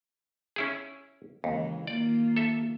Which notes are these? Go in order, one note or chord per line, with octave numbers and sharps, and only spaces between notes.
C#4 E4 G#4
D#2 C#3 E3 G#3
D#3 A#3 F4 D5
A4 E5